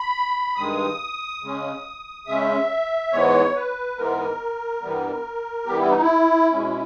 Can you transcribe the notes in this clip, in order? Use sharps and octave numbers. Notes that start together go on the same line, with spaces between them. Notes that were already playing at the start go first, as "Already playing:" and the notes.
Already playing: B5
G2 D#3 G#3 D#6
C#3 G#3 C#4
C#3 G#3 C#4 E5
G#2 E3 G#3 B3 C#5
B4
G#2 E3 G#3 B3 A#4
G2 E3 G3 B3
G2 E3 G3 B3 G4
E4
D#4
E4
B2 G#3 C#4